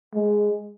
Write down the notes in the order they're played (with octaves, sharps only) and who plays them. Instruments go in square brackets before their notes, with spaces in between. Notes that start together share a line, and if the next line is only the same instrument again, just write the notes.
[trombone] G#3